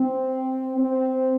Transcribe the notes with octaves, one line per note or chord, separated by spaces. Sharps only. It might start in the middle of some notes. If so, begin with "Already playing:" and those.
Already playing: C4
C4